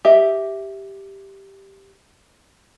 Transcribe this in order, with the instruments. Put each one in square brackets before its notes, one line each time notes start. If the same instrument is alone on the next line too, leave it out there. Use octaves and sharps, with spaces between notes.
[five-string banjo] G4 D#5 E5